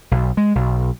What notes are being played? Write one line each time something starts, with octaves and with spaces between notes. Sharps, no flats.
B1
G#3
B1